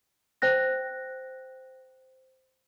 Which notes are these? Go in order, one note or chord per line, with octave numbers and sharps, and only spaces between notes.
C5 G5 F#6 A#6